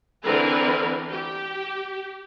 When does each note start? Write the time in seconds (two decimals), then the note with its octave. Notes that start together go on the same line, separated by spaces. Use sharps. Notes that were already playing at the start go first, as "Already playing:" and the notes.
0.23 D3 E3 C4 A#4 B4
1.10 G4